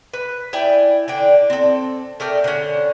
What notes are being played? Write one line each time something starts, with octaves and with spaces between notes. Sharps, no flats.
B4
E4 D5 G5 G#5
D3 D4 G5
C4 A4
A3 A#4 D5 G5
D3 C#4